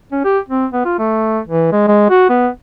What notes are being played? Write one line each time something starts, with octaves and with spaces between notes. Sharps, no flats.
C#4
G4
C4
B3
F4
A3
E3
G#3
G#3
F#4
B3